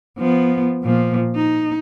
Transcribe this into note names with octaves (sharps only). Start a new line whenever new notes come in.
F3 B3
A#2 F3
D#4